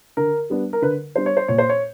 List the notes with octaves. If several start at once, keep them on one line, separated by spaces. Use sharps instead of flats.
D3 A#4
G3 B3 D4
A#4
D3 B4
G3 B3 D4 C5
C#5
C5
A#2 C#5
C5
C#5